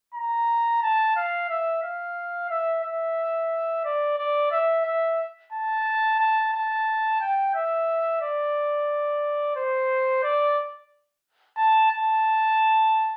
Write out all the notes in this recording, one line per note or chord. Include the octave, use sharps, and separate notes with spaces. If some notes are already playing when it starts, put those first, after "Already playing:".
A#5
A5
F5
E5
F5
E5
E5
D5
D5
E5
E5
A5
A5
A5
G5
E5
D5
C5
D5
A5
A5